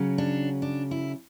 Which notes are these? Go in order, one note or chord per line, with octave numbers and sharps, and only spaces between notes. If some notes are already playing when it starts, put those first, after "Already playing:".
Already playing: C#3 F#3
D4
D4
E4